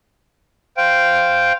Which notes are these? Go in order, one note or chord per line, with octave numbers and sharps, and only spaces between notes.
C5 F5 G5